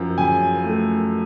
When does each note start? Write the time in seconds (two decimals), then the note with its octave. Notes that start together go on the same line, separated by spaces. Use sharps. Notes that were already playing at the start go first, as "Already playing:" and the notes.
Already playing: F#2 F3
0.18 C#3 G#5
0.64 A3